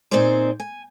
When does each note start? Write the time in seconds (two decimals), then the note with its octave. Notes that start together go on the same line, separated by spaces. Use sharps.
0.11 A#2 C4 D#4 G#4 C5 D5
0.60 G#5